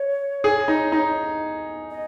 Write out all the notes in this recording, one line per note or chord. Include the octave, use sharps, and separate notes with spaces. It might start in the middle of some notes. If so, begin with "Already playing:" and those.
Already playing: C#5
G#4
D#4
D#4
D#5